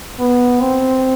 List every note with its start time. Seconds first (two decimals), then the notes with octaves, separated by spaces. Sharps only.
0.19 B3
0.61 C4